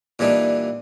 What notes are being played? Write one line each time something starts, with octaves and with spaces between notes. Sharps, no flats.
A#2 E3 G3 D4 D#4